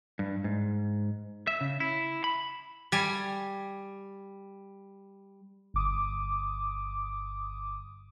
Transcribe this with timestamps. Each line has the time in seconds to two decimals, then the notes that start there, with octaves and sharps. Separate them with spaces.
0.19 G2
0.44 G#2
1.47 E5
1.61 C#3
1.80 E4
2.24 B5
2.92 G3 G#5
5.74 G1 D6 D#6